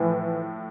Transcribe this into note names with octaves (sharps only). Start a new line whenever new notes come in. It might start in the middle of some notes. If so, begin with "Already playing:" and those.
Already playing: A2 E3 F3